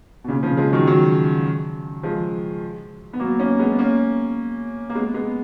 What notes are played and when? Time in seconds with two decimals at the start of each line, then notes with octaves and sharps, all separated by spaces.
0.24 B2
0.28 A#2 C#3
0.43 C#3 F3
0.57 F3 G#3
0.72 D#3 F#3
0.86 D#3 F#3
2.03 F3 G#3
3.13 B3
3.20 F#3 A#3
3.40 A#3 C#4
3.59 G#3 B3
3.79 A#3 C#4
4.90 A#3
4.95 G#3 B3
5.14 G#3 B3